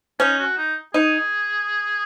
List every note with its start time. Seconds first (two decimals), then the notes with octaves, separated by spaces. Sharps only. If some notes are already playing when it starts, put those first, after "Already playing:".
0.20 C#4 D#4
0.39 F#4
0.57 D#4
0.94 D#4 G#4